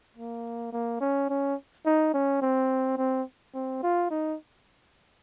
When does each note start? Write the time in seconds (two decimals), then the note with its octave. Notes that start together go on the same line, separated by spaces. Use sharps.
0.17 A#3
0.72 A#3
1.00 C#4
1.29 C#4
1.85 D#4
2.13 C#4
2.42 C4
2.97 C4
3.54 C4
3.83 F4
4.11 D#4